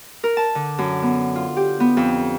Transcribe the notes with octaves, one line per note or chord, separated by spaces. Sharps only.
A#4
A5
D3
F#2
B3
F4
G4
B3
F2